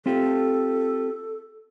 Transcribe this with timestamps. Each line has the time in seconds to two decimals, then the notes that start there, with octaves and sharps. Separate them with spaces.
0.06 C4 F4 G4 A4